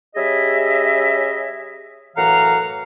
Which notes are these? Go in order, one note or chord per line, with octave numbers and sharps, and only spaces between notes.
G3 C#4 G#4 D#5 E5
F#2 A2 E3 F5 F#5 A#5